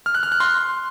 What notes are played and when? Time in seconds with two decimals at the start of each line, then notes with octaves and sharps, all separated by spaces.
0.06 F6
0.15 F#6
0.23 F6
0.32 F#6
0.40 C6